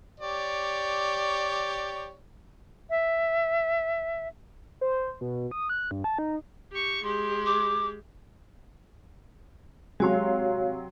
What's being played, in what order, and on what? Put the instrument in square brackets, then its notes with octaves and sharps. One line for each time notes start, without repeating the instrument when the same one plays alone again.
[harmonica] G4 C#5 D5
[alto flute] E5
[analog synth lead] C5
B2
D#6
F#6
G2
A5
D#4
[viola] G4 C#6
[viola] G#3 G4 [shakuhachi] C6
[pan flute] D6
[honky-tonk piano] C3 F#3 C6 [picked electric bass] G#3 [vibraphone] F#4 C#5 F5